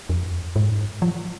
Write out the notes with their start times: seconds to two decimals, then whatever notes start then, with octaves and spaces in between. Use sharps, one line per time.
0.09 F2
0.56 G#2
1.02 F3